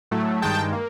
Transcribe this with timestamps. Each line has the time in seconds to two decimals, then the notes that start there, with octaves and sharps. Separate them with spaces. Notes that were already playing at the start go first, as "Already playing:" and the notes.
0.11 A2 F#3 A3
0.42 G2 D#3 G#3 G5 A5
0.73 A#3